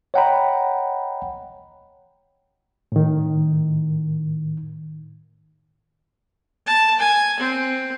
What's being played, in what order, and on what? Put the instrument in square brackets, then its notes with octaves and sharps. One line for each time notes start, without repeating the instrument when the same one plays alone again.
[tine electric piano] C#5 D#5 F#5 G5 A#5 B5
[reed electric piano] A2 D#3
[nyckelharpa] A5
G#5
C4